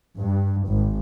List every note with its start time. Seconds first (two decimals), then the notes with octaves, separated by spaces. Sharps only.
0.18 G2
0.68 G#1